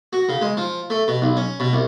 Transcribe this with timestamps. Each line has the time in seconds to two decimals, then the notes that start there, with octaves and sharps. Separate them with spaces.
0.13 F#4
0.29 C#3
0.42 G#3
0.57 F3
0.90 A3
1.08 B2
1.22 B1
1.37 C#4
1.60 B2
1.73 C2